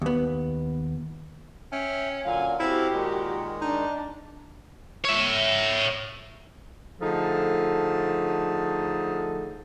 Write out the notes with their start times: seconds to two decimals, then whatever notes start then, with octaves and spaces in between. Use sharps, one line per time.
0.02 D#2 B3
1.72 C#4 E5 G5 F6
2.25 A#2 D3 F#3 F5 G#5
2.60 C4 E4 F#4 G4 A4 F5
2.93 A#2 D#3 G#3
3.61 D4 D#4
5.05 C#5 E5
7.01 D3 F3 A3 D#4 G#4 A4